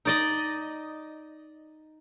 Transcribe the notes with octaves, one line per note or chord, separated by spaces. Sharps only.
D#4 D5 D#5